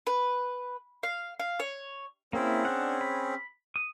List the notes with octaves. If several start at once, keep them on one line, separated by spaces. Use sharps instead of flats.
B4
F5
F5
C#5
A#3 C4 C#4 E4 G#4
D4 F#5
B5
D#6